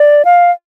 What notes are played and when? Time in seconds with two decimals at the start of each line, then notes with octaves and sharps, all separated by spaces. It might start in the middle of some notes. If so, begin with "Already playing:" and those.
Already playing: D5
0.25 F5